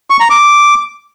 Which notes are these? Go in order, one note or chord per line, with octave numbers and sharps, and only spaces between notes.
C#6
A#5
D6